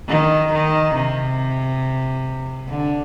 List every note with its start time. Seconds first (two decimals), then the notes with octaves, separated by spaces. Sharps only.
0.08 D#3
0.52 D#3
0.95 C3
2.69 D3